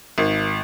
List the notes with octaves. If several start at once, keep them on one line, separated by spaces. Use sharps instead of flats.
G#1